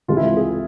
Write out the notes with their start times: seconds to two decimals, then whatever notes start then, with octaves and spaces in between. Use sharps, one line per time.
0.08 C#2 C3 E3 G#3 F4
0.17 E4
0.37 G#4